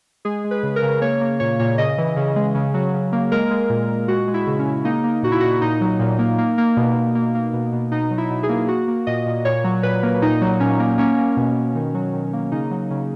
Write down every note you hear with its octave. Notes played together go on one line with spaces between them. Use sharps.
G#3 G#4
G#3
B4
C#3
A#4
C#3
A#3 C#5
A#3
A#2 C#5
A#2 C#5
C#3 D#5
E3
C#3
G#3
C#3
F#3
C#3
A#3
G#3 A#4
G#3
A#2
A#2
G#3 F#4
G#3
E4
C#3
C#4
C#3
A#3 D#4
A#3
A#2 F#4
E4
A#2 F#4
A#2 D#4
F#3
A#2
A#3
A#3
A#3
B2
B2
A#3
A#3
B2
B2
B2 D#4
F#3
E4
B2
G#4
A#3
A#3 F#4
A#3
A#2 D#5
A#2
A#2 C#5
F#3
A#2 B4
A#3
A#2 D#4
F#3
A#2 C#4
A#3
A#3 C#4
A#3
B2
B2
D#3
F#3
D#3
A#3
C#3 D#4
F#3
C#3